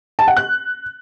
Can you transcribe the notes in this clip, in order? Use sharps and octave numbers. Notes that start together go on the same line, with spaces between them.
A5
F#5
F#6